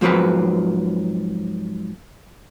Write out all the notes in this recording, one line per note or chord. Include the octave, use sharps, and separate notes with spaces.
G#2 F3 F#3 C4 A#4 B4